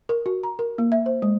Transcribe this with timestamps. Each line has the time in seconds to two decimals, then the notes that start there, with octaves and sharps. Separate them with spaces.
0.09 A#4
0.26 F#4
0.43 A#5
0.59 A#4
0.78 A#3
0.92 E5
1.06 C5
1.22 G#3